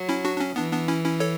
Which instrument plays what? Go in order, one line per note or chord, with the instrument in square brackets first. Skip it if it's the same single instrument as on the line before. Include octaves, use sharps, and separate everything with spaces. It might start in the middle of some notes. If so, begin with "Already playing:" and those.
Already playing: [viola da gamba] F#3
[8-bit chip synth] C#4 E4
D4 F#4
D4
C#4
[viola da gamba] E3 [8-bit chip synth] B3 D4
[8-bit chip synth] B3 D4
C#4 E4
C#4 E4
A4 C#5